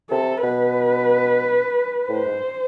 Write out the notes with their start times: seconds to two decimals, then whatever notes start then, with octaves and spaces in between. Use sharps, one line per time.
0.11 C3 A4
0.43 B2 B4
2.09 A2 C5
2.27 G#2